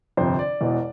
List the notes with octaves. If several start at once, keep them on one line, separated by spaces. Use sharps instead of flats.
G1 F2 C3 C5
D5
E1 E2 B2